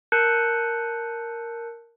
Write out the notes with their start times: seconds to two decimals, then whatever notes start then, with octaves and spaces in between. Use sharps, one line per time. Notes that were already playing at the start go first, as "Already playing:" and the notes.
0.12 A#4 A5 F#6 G6 C#7